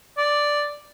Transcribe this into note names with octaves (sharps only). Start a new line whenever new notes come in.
D5